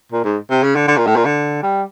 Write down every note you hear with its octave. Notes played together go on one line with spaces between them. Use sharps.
A#2
G#2
C3
C#3
D3
D3
A#2
A2
A#2
D3
G3